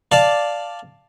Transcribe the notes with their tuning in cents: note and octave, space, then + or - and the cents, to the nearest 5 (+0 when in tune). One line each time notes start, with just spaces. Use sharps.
D5 +0 F5 +0 A5 +0